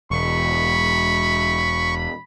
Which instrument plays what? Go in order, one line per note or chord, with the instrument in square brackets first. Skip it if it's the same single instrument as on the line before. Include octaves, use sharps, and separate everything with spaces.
[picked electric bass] E1 [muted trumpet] B5 [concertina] C#6